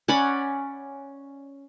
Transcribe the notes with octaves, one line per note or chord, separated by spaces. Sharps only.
C#4 D5 F#5 B5